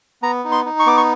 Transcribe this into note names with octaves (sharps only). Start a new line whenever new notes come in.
B3 A#5
D#4
C6
D#4
C#6
B3 D6
C#6